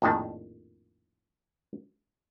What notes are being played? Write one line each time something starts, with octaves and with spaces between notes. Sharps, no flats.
A#1 F2 A2 D#3 A5